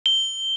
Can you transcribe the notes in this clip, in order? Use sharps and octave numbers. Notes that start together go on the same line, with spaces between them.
G7